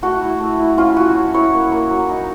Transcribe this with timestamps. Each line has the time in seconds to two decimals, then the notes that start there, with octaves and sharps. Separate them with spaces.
0.03 A3 F#4
0.21 E4
0.40 A3
0.59 E4
0.78 C#4 F4
0.96 C#4 F#4
1.15 C#4
1.34 E4 C#5
1.53 A#3
1.72 A#3
1.90 F#3
2.09 D#4